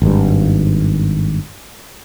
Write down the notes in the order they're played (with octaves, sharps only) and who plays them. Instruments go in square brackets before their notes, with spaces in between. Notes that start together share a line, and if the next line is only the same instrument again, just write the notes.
[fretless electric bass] G#1 G2